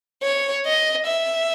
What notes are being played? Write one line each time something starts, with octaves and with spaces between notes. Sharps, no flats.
C#5
D#5
E5